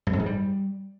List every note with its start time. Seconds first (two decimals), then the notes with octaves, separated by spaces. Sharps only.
0.07 G2
0.13 F2
0.20 G#2
0.26 G3